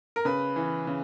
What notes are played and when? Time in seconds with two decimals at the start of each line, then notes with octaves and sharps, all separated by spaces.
0.16 A#4
0.25 C#3 B4
0.56 E3
0.87 C#3